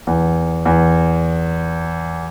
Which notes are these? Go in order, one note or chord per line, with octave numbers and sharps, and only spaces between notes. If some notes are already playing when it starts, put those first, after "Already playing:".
E2
E2